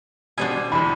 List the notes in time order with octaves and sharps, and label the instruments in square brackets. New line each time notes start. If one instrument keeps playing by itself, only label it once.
[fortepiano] B2 G3 [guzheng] D4 C5 G#5
[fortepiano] E2 C3 [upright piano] B5